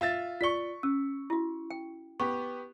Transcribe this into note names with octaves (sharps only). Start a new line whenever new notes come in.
F4 E5 A6
F4 D5 C#6 B6 G7
C#4 E6
E4 F#4
G5
B3 G4 C#6